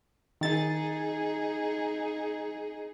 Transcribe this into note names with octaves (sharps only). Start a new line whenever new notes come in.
D#3 D#4 G#4 A6